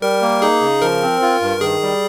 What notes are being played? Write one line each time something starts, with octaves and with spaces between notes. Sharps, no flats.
G3 A#4
A#3
D#4 G#4
C#3
F3 A#4
C4
F4
G2
D#3 G#4
G3